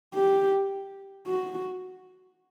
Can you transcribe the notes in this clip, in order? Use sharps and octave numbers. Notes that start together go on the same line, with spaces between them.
G4
F#4